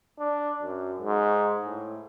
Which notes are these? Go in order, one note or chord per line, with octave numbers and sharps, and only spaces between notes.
D4
F#2
G#2
A2